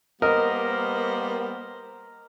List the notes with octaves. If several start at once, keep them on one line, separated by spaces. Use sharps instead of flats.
G3 A#3 B3 A#4 C5 D#5